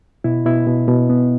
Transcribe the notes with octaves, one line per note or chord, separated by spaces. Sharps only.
B2 E4
B2 E4
B2
B2
B3